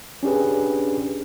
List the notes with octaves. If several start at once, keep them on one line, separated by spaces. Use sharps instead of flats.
C#4 D4 G4 G#4 B4